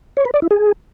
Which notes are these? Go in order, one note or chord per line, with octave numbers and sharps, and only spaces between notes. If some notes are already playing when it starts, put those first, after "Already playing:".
C#5
B4
D5
E4
G#4